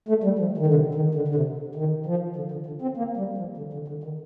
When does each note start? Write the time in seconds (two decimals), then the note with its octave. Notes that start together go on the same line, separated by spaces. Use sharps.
0.09 A3
0.24 G3
0.39 F3
0.58 D#3
0.66 D3
0.74 C3
0.95 D#3
1.15 D3
1.28 D3
1.35 C3
1.75 D#3
2.06 F3
2.36 D3
2.52 D3
2.66 D3
2.82 C4
2.97 A#3
3.17 G3
3.38 F3
3.57 D3
3.73 D3
3.88 D3
4.04 D#3